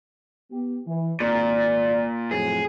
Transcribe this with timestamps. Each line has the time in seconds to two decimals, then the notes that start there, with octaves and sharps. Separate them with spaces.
0.52 B3 G4
0.87 E3
1.20 G#1 A#2 D5
2.31 F2 A2 F#3 G#4